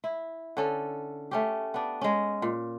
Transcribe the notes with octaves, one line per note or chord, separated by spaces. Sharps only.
E4
D3 C#4 A4
A3 C#4 G4
B3 D4
G#3 C#4
A#2